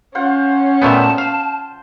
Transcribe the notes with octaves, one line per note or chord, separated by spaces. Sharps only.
C#4 F4 C5 F#5
A#2 A3 B3 G5 A5
F5